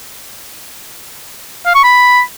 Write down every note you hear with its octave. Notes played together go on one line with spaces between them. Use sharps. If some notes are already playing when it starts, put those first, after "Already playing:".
F5
C#6
B5